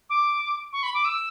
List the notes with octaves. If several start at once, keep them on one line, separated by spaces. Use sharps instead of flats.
D6
C#6
B5
D6
E6